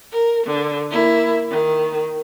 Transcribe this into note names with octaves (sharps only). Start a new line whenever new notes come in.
A#4
D3
A#3 E4
D#3